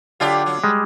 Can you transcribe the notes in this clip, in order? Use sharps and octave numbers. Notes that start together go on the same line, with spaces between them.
D3 F#3 F4 G4 D5 F5
F#3
G3 G#3